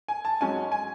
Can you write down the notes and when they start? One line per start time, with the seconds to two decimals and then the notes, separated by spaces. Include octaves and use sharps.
0.08 G#5
0.25 A5
0.40 G#2 F#3 C#4 G#5
0.72 G#5